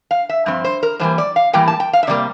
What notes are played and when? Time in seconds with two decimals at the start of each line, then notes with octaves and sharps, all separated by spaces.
0.11 F5
0.29 E5
0.46 G2 F3 C4
0.64 C5
0.83 A#4
0.99 A2 E3 G3 A#3 C5
1.18 D5
1.36 F5
1.53 A2 E3 G3 A#3 G5
1.68 A5
1.80 G5
1.93 F5
2.03 E5
2.07 C3 G3 A#3 D5